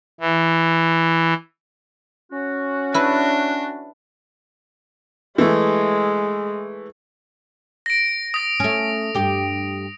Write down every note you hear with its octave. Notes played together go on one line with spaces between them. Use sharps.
E3
C#4 F#4
D4 E4 B4
E3 G#3 A3
A#6 D7
D#6 A#6
A3 C#4
G2 G4